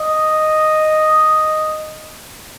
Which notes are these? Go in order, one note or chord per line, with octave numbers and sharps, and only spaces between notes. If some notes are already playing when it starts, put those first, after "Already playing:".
Already playing: D#5